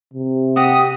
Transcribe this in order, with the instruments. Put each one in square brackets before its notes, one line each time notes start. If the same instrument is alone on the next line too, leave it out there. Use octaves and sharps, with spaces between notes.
[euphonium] C3
[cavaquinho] F#4 G4 F#5 [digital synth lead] D#6